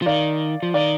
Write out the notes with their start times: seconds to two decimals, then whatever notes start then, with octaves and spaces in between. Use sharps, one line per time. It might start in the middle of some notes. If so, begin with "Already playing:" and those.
0.02 F3
0.06 D#3 D5 F5
0.63 F3
0.74 D#3 D5 F5